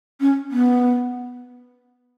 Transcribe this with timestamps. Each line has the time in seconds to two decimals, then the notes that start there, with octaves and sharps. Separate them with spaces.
0.21 C#4
0.52 B3